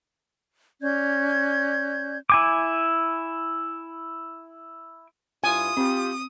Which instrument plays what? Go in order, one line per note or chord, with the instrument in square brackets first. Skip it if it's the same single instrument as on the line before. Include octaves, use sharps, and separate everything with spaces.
[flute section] C#4 D5 G6 G#6
[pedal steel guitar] E4 G#5 D6
[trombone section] G2 E4 F4 [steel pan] G#5 [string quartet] D#6
[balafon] C4 [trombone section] F4 G4